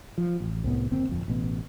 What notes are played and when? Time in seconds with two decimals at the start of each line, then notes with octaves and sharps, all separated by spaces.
0.18 F3
0.40 A1
0.64 C2 A2 B3
0.91 G1 D#2 A#3 C4
1.09 D1 F2
1.28 A1 B2